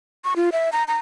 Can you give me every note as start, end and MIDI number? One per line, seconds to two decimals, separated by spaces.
0.24 0.34 85
0.36 0.50 65
0.52 0.70 76
0.72 0.84 82
0.88 0.98 82